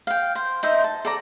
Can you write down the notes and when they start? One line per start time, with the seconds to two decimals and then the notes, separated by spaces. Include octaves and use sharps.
0.07 F5 G5
0.35 C5
0.63 D#4 C5 E5
0.84 A5
1.05 A4 D5 A#5